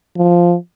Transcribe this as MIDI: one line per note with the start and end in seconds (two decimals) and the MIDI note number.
0.17 0.55 53